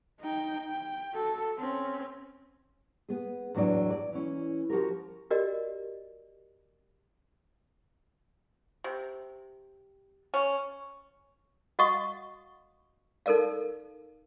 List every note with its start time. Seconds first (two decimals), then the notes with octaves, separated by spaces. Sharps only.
0.20 D#4 G5
0.70 G5
1.12 F#4 A4
1.58 C4 C#4
3.09 B3 G#4
3.54 E2 A2 F#3 D4 D5
3.90 D5
4.12 E3 C#4
4.70 F3 F#4 G4 A#4
5.31 F#4 G4 A#4 D5 D#5
8.84 C3
10.34 C#4
11.79 F#4 D#5 F5 F#5 C#6 D#6
13.26 D#4 A4 A#4 D5 F5